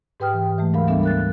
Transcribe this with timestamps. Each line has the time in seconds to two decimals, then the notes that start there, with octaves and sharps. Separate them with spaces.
0.20 G#2 G4 B4 G5 D#6 F6
0.33 E3
0.58 E3 G#3 A3
0.73 D2 G#2 F#3 A#4 F5 B5
0.87 E3 G3 B3 D4 A4 E5
1.03 A#4 F#6 A6